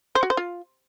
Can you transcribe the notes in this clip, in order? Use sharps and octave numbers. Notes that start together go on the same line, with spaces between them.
C5
F#4
C5
F4